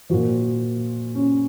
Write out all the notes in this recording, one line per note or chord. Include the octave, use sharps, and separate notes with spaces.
A#2 F3 F#4
C#4